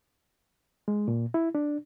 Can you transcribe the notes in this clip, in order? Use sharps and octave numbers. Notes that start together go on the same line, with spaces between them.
G#3
A#2
E4
D4